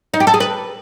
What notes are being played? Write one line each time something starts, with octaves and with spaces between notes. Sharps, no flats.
D#4
G4
A4
G#4
B4